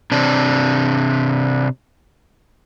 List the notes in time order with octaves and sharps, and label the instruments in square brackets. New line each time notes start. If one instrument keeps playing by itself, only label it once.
[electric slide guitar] C3 D4